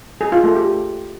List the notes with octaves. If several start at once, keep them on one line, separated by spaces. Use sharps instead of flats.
G#4
F4
A3
G4